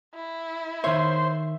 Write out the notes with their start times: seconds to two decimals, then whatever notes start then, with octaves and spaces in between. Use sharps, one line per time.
0.15 E4
0.84 D#3 C5 C#5 E5